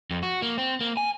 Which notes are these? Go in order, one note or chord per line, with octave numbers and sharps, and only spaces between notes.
F2
F#4
A#3
C4
A#3
G#5